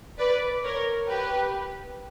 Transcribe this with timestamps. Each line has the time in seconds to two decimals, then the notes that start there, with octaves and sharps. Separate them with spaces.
0.18 B4 D5
0.64 A#4 C#5
1.08 G4 B4